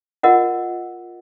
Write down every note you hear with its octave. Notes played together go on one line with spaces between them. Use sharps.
F4 A#4 D#5 F#5